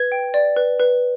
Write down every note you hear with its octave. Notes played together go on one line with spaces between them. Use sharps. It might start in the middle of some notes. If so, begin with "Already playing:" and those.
Already playing: B4 G#6
G5
D5
B4
B4